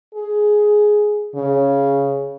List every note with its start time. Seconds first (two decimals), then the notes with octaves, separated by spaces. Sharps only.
0.15 G#4
1.35 C#3